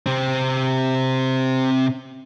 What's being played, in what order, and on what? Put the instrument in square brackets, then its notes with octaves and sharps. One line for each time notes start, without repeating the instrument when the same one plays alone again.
[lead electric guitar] C3 C4